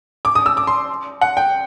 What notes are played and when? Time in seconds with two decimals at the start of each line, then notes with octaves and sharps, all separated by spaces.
0.25 D6
0.35 D#6
0.46 E6
0.57 D6
0.67 C6
1.21 F#5
1.37 G5